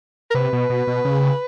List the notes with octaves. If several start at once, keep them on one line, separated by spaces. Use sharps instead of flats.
A#4
C3 B4
B2
B2
B2
C#3